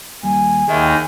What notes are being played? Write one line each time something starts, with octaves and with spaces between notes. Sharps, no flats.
D#2 G3 G#5
D#2 D#3 G#4 E5 G5